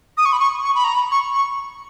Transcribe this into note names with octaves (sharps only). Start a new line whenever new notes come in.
D#6
C#6
B5
C#6
C#6
B5
A#5
B5
C#6
C#6